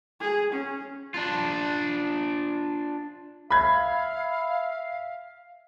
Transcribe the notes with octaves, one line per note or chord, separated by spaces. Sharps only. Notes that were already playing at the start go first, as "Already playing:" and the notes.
G#4
C#4
D4 F4
E5 F5 B5 G#6